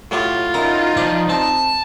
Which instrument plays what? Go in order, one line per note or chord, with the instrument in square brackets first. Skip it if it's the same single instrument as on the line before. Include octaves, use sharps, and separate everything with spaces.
[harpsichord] A2 F#3 G4 [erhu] F4
[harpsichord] F#2 E4 A#5 [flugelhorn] D#4
[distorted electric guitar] F3 [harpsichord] D5
[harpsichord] C4 [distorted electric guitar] A5